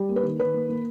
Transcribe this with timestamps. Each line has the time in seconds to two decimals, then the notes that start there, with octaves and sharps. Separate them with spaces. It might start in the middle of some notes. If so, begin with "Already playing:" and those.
Already playing: G3
0.09 A#3
0.16 B4
0.23 D#3
0.40 D#3 B4
0.54 A#3
0.69 A#3